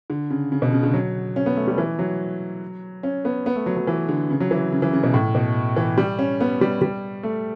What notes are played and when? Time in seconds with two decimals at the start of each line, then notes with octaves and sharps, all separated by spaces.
0.10 D3
0.30 C#3
0.52 C#3
0.62 B2
0.72 C#3
0.83 D3
0.94 F#3
1.36 C#4
1.46 B3
1.57 A3
1.67 G3
1.78 E3
1.99 F#3
3.03 C#4
3.25 B3
3.46 B3
3.56 A3
3.66 F#3
3.77 F#3
3.87 E3
4.08 D3
4.30 C#3
4.40 F#3
4.51 E3
4.72 C#3
4.82 E3
4.93 C#3
5.04 B2
5.14 A2
5.35 B2
5.76 E3
5.98 G3
6.19 C#4
6.40 B3
6.61 G3
6.81 G3
7.23 A3